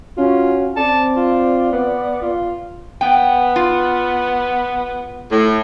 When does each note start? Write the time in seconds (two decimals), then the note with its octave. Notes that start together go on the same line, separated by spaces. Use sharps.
0.17 C#4 F4 F#4
0.77 C4 D5 A5
1.16 F4
1.72 B3
2.22 F4
3.01 B3 G5
3.56 F4
5.31 A2